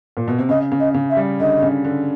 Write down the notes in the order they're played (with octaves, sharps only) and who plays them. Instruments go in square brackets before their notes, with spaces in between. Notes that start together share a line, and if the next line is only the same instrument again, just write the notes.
[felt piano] A#2
B2
C3
[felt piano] C#3 [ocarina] D#5
[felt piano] C#3
[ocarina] D#5
[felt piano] C#3
[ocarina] E5
[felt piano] G3
[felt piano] D3 [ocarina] D#5
[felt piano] C#3
D3